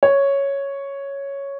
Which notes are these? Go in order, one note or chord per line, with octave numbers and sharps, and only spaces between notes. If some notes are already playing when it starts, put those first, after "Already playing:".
C#5